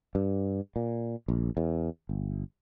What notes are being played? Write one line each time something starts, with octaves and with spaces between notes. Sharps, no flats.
G2
A#2
A#1
E2
G1